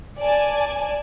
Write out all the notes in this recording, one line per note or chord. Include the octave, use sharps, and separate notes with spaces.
D5 G#5 A5